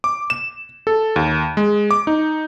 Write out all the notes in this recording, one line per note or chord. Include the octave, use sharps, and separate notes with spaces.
D6
E7
A4
D#2
G#3
D6
D#4